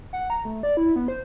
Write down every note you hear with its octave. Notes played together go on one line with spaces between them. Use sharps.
F#5
A#5
A3
D5
E4
B3
C5